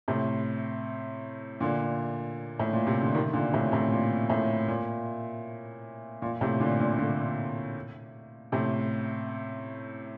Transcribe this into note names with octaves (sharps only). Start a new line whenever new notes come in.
A2 C3
A#2 D3
A2
A#2
C3
D3
C3 D#3
A#2 D3
A2 C3
A2 C3
A#2
A2
A#2
A#2
A2 C3
A#2 D3
A#2 D3
A#2 D3
A2 C3